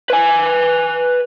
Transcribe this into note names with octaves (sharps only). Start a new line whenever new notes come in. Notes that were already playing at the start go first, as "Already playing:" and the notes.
B4 G#5